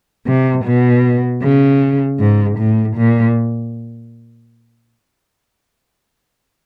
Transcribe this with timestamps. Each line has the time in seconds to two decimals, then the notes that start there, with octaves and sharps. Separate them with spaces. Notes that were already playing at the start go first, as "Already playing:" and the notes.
0.27 C3
0.65 B2
1.43 C#3
2.19 G#2
2.58 A2
2.97 A#2